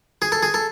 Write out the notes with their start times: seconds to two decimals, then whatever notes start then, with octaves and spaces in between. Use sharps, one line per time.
0.22 G#4
0.32 A4
0.43 G#4
0.54 A4